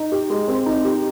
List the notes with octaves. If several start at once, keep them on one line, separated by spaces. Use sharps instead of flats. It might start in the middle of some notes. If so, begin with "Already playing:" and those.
Already playing: D#4
G4
G#3
C4
D#4
G4